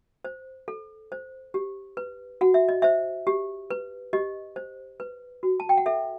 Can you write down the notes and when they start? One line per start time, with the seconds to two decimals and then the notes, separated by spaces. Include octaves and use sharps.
0.25 C5
0.68 A4
1.12 C5
1.54 G4
1.97 B4
2.41 F#4 F#5
2.54 E5
2.69 D#5
2.82 C5 E5
3.27 G4
3.70 B4
4.13 G4 D#5
4.56 C5
5.00 B4
5.43 F#4
5.60 A5
5.69 G5
5.78 F#5
5.86 A4 E5